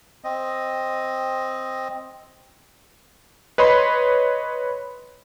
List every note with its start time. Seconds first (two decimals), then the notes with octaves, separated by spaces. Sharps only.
0.24 C4 D#5
3.58 B4 C#5 D#5 B5 C6